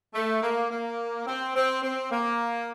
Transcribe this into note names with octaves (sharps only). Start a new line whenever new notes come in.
A3
A#3
A#3
C4
C4
C4
A#3